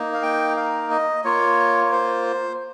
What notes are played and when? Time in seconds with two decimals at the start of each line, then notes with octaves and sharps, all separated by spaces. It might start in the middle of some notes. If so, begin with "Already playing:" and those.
Already playing: A#3 D#4
0.13 F5
0.23 G5
0.57 F5
0.90 D#5
1.24 A#3 F4 C#5
1.85 C#5
1.92 C5